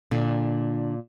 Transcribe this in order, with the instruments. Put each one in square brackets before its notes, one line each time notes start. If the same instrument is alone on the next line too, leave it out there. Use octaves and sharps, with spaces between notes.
[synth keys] A#2 [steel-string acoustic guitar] D3 D4